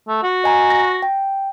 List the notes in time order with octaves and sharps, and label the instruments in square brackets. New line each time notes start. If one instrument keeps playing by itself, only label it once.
[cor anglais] A3
F#4
[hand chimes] D#5 G#5 A#5
A#6
G5